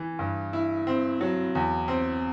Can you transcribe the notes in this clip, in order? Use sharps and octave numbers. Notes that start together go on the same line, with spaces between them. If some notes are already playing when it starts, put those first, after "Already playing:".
Already playing: E3
G2
E4
C4
F#3
E2
C4